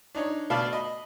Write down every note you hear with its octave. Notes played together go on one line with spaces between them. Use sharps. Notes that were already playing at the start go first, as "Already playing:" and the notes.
D4 D#4 C#5
B2 A3 D5 F5 A5 B5
D#5 B5